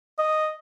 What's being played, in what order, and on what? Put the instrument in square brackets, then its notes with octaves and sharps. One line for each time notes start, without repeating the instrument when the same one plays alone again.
[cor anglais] D#5